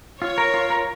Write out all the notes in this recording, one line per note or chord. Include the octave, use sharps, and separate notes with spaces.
F4 C#5
A#4
F4
A#4